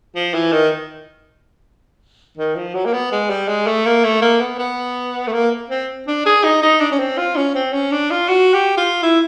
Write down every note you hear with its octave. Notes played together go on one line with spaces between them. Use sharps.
F3
E3
D#3
D#3
F3
F#3
A#3
B3
G#3
G3
G#3
A3
A#3
A3
A#3
B3
B3
A3
A#3
C4
D4
G#4
D#4
D#4
D4
C#4
C4
F4
C#4
C4
C#4
D4
F4
F#4
G4
F4
E4